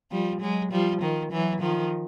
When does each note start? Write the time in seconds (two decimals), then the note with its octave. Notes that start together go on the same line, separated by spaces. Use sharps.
0.12 F3 G3
0.41 F#3 G#3
0.72 F3 G3
1.02 D#3 F3
1.31 E3 F#3
1.61 D#3 F3